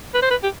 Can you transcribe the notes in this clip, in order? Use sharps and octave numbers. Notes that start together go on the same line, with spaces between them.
B4
C5
B4
G4